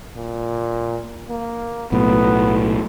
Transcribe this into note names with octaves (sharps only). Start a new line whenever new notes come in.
A#2
A#3
B1 A2 B3